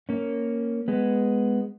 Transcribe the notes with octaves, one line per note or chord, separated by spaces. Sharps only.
A#3 C#4
G#3 B3